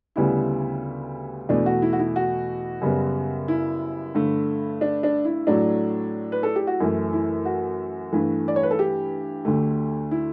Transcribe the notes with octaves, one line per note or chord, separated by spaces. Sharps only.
D2 C#3 G3 B3 E4
E2 B2 A3 D4
F#4
E4
F#4
E4
F#4
F#2 C#3 G3 B3
E4
G2 D3 A3
D4
D4
E4
A2 F#3 A3 D4
B4
A4
G4
F#4
F#2 E3 A3 E4
E4
F#4
G2 E3 A3
D5
C#5
B4
A4
G4
D2 D3 A3
E4